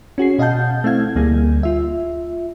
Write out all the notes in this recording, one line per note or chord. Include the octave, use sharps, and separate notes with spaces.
C#4 F#4 G#4 C7
B2 D#5 F5 F#5 A5 G6
A3 C4 E4 F5 G#6
D2 G3 A#3 G#4
F4 E5